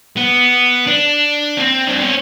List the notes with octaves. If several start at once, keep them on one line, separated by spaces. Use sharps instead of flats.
B3
D4
C4
D4
C#4